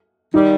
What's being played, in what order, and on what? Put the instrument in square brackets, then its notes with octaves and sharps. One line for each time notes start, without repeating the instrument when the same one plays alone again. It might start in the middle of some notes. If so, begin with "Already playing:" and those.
[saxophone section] D#3 G3 [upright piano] D#4